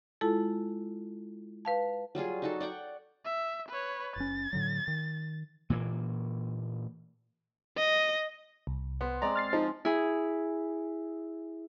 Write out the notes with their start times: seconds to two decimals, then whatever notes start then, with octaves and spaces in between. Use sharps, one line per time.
0.21 G#3 E4 F4 A4 A5
1.65 B4 F5 A5
2.15 F#3 G3 F4 G#4
2.42 D#4 F#4 A4
2.60 D5 F#5 G5 C#6
3.25 E5
3.69 B4 C#5
4.16 F#1 C#4 A6
4.53 A2 D3 F#3
4.88 D#3
5.70 A#2 E3 A#3
7.77 D#5
8.67 C2
9.01 B3 C5
9.22 G#3 C4 D5 A#5
9.36 F6 A6 C7
9.53 F3 D#4
9.85 E4 G#4